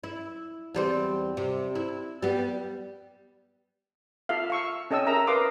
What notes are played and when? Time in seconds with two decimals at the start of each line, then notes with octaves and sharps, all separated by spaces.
0.04 E4
0.74 E2 G3 C4
1.37 C3
1.75 E4
2.23 G3 B3
4.29 F4 A4 E5 F5
4.50 F5 C#6 E6
4.91 C#4 A4 D#5 G5 E6
5.06 G#4 A#4 E5 A#5 E6
5.27 A#4 B4 F5 C6 D6 D#6